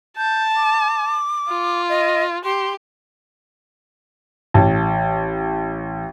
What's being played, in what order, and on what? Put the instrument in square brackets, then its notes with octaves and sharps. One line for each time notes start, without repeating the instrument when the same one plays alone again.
[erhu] A5 [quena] G6
[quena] D6
[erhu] F4
[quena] D#5
[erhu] G4 [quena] C6
[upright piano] A1 A5